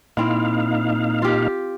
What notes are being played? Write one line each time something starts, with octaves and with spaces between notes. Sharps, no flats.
A#2 C4 D#4 E4 F5
F4 G4